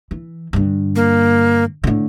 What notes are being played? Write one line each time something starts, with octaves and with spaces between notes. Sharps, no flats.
E3
G2 D3
A#3
A2 D3